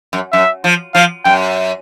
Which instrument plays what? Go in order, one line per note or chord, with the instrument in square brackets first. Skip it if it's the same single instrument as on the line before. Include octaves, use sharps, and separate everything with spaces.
[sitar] F#2
[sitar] F#2 [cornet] E5
[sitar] F3
[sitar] F3 [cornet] F5
[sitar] F#2 [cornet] G5